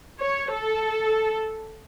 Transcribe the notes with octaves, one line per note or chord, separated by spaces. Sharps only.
C#5
A4